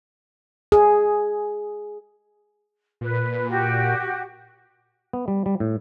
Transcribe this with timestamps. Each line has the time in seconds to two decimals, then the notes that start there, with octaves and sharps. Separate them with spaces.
0.72 G#4
3.01 A#2 B4
3.49 F#4 G4
5.13 B3
5.28 G3
5.46 G3
5.60 A2